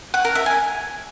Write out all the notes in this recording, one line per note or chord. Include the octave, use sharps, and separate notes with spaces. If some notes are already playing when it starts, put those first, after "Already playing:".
F#5
A#4
E5
G#5